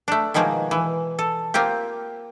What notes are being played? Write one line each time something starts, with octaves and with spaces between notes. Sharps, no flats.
A3 D4
B2 D#3 F3 G#3 A#3
E3
A4
A#3 C4 F4 G4